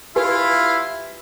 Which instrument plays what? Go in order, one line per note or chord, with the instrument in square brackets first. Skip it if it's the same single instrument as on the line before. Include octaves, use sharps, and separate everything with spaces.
[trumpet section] E4 [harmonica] F4 F5 [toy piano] G4 B4 G#5